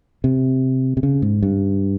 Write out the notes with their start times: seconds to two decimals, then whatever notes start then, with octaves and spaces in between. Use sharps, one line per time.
0.24 C3
0.97 C3
1.03 C#3
1.22 G#2
1.43 G2